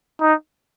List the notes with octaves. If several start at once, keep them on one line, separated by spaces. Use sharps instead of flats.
D#4